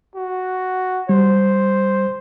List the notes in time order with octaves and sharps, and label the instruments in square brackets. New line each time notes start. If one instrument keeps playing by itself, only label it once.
[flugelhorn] F#4
[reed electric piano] G3 [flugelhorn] C5